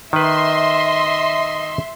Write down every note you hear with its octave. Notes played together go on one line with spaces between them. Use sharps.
D#3 B4 D#5 E5 C6